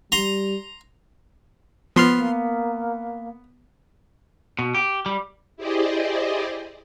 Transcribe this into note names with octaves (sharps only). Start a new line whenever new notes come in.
G3 A#5 C6
F3 B3 C6 F6
A#3
B2
G4
G3
E4 G4 G#4 C5 D5 D#5